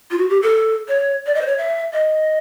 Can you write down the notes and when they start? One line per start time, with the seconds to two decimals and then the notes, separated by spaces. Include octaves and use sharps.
0.11 F4
0.18 F#4
0.30 G4
0.42 A4
0.88 C#5
1.26 D5
1.35 D#5
1.41 C5
1.46 C#5
1.58 E5
1.93 D#5